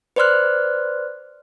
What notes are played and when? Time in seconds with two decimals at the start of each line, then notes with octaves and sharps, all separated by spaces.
0.16 B4 C5 D5 C6 F6 F#6